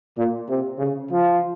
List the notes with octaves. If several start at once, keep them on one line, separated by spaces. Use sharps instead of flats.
A#2
C3
C#3
F3